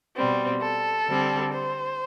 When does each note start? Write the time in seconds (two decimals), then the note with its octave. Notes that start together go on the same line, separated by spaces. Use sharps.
0.16 B2 G3 C4
0.62 A4
1.07 D3 G3 C4
1.53 C5